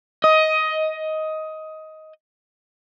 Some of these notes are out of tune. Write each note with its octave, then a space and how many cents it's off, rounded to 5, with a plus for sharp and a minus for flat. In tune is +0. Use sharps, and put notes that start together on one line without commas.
D#5 +15